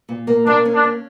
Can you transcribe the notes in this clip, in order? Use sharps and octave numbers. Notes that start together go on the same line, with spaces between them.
A#2
A#3
A#3 D4
C#4
D4
C#4